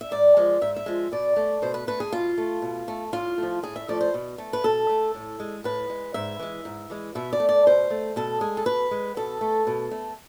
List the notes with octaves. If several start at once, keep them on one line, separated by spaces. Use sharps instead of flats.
E5
G#2 D5
F3 G#3
G#2 E5
E5
F3 G#3
B2 D5
A3
B2 C5
B4
A3 B4
G#4
B2 F4
A3
B2
A3
A2 F4
F3 A3
A2 G#4
E5
F3 A3 D5
C5
B2
A3
B4
B2 A4
A3
A2
G#3
A2 B4
G#3
G#2 E5
E3 G#3
G#2
E3 G#3
B2 E5
D5
A3
D5
B2 C5
A3
B2 A4
G#3 G#4
A4
B2 B4
G#3
B2 A4
A3
B2
A3